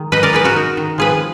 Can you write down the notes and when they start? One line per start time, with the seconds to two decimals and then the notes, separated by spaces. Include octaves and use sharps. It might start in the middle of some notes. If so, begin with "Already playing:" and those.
Already playing: D#3 G#3
0.12 D#4 B4 D#5
0.23 A#4 D5
0.33 D#4 G#4 B4
0.44 F#4 A#4
0.56 D#4
0.77 D#3
0.98 F3 G#4 B4